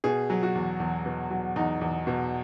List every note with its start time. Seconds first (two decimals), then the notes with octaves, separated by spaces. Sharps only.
0.04 B2 G#4
0.30 F#3
0.43 F#4
0.55 E2
0.80 E2
1.06 B2
1.31 F#3
1.56 E2 D#4
1.81 E2
2.07 B2